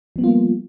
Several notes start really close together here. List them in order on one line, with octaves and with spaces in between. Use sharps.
F3 B3 G3 F4 A#3